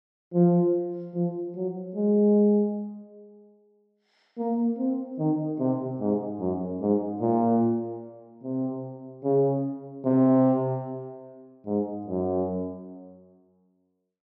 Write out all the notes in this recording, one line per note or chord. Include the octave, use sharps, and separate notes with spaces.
F3
F3
F#3
G#3
A#3
C4
D#3
C3
G#2
F#2
G#2
A#2
C3
C#3
C3
G#2
F#2